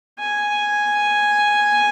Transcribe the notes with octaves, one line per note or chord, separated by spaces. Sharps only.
G#5